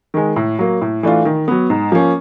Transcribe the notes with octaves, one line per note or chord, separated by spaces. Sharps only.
D#3 G#3
A2
F#3 A#3
A2
E3 A3 D4 F4
D#3
F#3 B3
G#2
F3 A#3 C#4